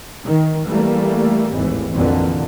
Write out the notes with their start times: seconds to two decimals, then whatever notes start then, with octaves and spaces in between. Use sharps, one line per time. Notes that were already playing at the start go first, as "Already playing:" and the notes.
0.23 D#3
0.67 E3 G3 A3 A#3
1.53 G#1 D#2 A2 E3
1.94 A#1 F2 A#2 D3 E3